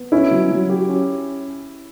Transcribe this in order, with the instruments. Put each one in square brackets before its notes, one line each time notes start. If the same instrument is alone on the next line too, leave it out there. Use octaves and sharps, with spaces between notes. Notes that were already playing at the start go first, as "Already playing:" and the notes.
Already playing: [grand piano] B3
[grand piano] C#4 [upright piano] E4
[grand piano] F#3
F#3
G4
C#4